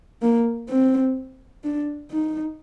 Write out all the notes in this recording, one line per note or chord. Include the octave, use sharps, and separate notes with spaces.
A#3
C4
D4
D#4